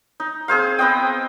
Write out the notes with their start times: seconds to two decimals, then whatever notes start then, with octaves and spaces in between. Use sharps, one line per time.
0.20 D#4
0.48 C4 G#4 C5 F5
0.79 B3 C4 D#5 G5